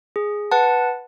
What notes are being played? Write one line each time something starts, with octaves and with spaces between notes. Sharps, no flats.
G#4
B4 F#5 A5